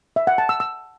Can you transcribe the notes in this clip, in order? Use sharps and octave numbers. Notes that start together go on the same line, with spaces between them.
E5
F#5
A5
E6
E6